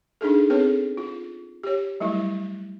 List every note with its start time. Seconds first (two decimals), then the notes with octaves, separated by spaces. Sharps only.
0.21 D4 D#4 G#4 A4
0.50 B3 C4 G#4 A4 B4 C#5
0.97 F4
1.63 G4 C#5
2.00 F#3 G3 A3 E4